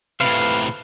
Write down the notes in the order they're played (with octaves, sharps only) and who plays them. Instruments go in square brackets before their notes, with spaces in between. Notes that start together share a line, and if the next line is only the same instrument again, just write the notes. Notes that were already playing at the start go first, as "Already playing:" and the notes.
[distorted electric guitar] A2 C3 [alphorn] B4 [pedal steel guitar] F5